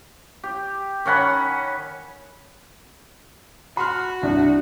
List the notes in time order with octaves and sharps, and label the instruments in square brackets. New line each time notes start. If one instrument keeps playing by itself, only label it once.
[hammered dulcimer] G4
D#3 C#4 F#5 B5
[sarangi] F#4 [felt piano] B5 C6 F6
[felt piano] C2 [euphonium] D4